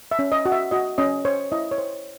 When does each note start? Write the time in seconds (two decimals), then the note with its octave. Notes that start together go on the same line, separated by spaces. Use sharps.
0.11 E5
0.19 C#4
0.32 D#5
0.46 F#4
0.52 E5
0.71 F#4 D#5
0.98 C#4 D#5
1.25 C5 C#5
1.52 E4 D#5
1.71 C#5
1.78 C5